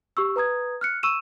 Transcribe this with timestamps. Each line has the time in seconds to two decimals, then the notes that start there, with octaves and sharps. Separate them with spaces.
0.17 G4 C#6 E6
0.36 B4 A#5 D#6 G#6
0.81 F6 F#6 C#7
1.03 C#6 E6 D#7 E7